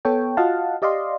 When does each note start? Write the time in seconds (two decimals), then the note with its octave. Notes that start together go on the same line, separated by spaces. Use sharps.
0.05 B3 A4 C#5 G5
0.37 F4 F#4 D#5 F5 F#5 A5
0.82 G4 D5 D#5 F5 C6